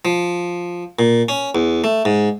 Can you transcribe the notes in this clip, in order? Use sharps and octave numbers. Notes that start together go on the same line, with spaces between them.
F3
A#2
C#4
E2
A3
G#2